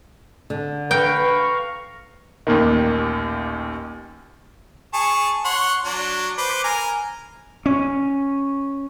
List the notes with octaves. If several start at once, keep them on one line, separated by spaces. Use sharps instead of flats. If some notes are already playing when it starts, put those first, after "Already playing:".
D3
B4 F5 G5 A#5 C#6
A1 D#2 A#2 D#3
G#4 A5 C#6
C#5 F#5 C6
F#3 D4
B4 C5 D6
A#4 G#5 A#5
C#4